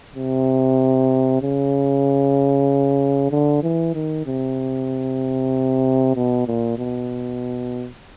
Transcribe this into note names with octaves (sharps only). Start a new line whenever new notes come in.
C3
C#3
D3
E3
D#3
C3
B2
A#2
B2